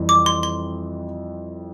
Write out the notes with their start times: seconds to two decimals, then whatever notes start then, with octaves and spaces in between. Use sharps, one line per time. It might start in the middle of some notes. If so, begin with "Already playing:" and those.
Already playing: F2 E3 G3
0.09 D6
0.26 C6
0.43 C6